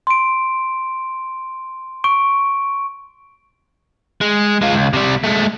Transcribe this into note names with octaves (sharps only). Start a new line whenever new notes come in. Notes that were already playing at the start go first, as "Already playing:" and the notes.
C6 D7
C#6 D7
G#3
G#3 F4
C#2
C3 G3
G#3 A3